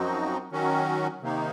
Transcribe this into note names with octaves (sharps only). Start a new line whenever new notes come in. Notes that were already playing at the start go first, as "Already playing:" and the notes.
Already playing: F#2 F3 C4 D#4 F#4
D#3 F#3 C#4 F#4
C3 D#3 A#3 D#4